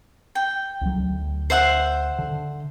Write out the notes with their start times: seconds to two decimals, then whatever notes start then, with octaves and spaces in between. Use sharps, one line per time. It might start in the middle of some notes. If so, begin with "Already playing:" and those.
0.35 G5
0.81 C#2 F#3
0.99 D2
1.50 C5 E5 F#5
2.19 D3